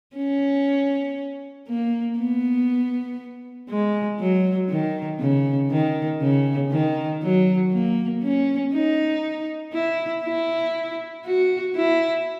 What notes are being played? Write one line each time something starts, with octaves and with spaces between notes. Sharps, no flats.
C#4
A#3
B3
G#3
F#3
D#3
C#3
D#3
C#3
D#3
F#3
A#3
C#4
D#4
E4
E4
F#4
E4